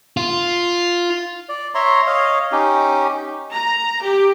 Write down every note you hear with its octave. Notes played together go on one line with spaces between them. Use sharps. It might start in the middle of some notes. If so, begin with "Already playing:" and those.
F4
D5
C#5 E5 A#5 C6
C#5 D#5 F5
C#4 D#4 G4
A#5
G4